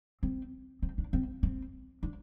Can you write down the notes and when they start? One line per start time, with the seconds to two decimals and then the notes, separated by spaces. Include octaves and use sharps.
0.23 C4
0.82 C4
0.98 D4
1.13 C4
1.43 C4
2.03 D4